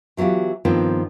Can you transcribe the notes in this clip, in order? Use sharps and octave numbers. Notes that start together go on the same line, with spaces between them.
E3 F#3 B3 F4 G4
G2 D#3 F3 B3 C4